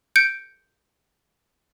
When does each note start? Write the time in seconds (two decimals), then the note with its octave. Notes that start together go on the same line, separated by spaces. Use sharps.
0.16 G6 C#7 D7